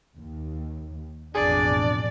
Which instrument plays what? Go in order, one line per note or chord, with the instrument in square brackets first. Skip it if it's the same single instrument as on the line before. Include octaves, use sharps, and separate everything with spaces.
[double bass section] D#2
[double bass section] A1 F2 B2 [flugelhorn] D4 [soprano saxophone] G#4 [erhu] D5